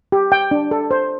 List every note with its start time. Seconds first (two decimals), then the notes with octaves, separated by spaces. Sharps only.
0.12 G4
0.32 G5
0.51 D4
0.71 A4
0.91 C5